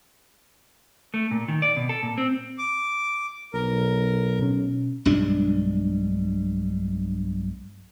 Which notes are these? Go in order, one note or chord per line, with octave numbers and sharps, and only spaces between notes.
A3
A#2
D#3
D5
B2
A4
A#2
C4
D6
B1 A#4
B2 C#4
B1 G2 G#3 D4